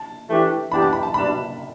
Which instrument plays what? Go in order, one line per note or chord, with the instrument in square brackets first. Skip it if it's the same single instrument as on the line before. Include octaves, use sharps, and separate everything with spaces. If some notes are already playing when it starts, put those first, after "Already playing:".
Already playing: [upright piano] A5
[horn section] E3 A3 D4 G4
[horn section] E3 B3 D4 G4 [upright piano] B5
[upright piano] A5
B5
A5
[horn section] B2 G3 D4 [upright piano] B5